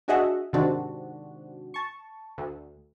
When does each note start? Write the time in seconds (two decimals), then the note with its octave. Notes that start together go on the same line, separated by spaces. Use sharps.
0.08 D4 F#4 G#4 D#5 E5 F#5
0.53 G#2 C3 D#3 C4 D4 F#4
1.74 A5 C#6
2.38 D2